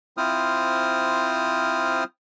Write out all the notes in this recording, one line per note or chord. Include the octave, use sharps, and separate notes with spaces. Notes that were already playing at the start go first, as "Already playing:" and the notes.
C4 E4 F4 C5 D#6 F6